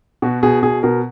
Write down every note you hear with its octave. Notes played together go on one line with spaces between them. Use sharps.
B2 F#4
B2 G#4
B2 G#4
B2 A#4